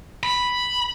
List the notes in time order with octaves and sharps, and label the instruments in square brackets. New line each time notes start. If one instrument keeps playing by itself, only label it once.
[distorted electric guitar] B5